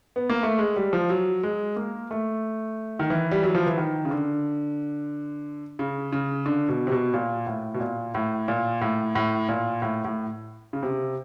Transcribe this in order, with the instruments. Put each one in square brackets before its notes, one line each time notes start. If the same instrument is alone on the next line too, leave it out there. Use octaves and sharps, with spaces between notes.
[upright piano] B3
A#3
A3
G#3
G3
F3
F#3
G#3
A#3
A3
D#3
E3
G3
F#3
F3
E3
D#3
C#3
D3
C#3
C#3
D3
B2
C3
B2
A#2
A2
B2
A#2
A2
A#2
A2
A2
A#2
A2
A2
C#3
C3